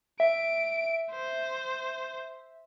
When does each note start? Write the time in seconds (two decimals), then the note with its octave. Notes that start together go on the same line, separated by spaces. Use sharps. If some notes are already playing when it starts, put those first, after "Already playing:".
0.20 E5 D7
1.11 C5